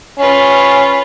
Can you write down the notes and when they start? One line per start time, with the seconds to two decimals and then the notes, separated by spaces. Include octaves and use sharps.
0.18 C#4 F4 B4